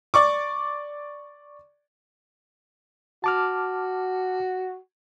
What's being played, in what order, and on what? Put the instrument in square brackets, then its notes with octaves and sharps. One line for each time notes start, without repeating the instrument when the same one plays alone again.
[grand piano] D5 C#6 D6
[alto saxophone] F#4 [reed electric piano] A5 D6 F6